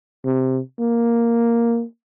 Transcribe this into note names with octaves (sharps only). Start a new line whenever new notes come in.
C3
A#3